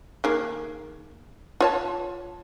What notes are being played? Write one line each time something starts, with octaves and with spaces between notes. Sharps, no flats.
D#3 A#3 G#4
F4 C#5 A5